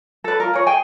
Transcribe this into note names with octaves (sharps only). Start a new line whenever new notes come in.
A4 B4
F4 A#4
G#4 C#5
G#4 G5 G#5